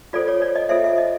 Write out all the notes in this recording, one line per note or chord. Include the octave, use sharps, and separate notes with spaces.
F4 A4 C5 D5
C#5
D5
D#5
F4 A4 C5 E5
E5
D#5